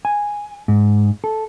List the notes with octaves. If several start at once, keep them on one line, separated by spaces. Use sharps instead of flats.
G#5
G#2
A4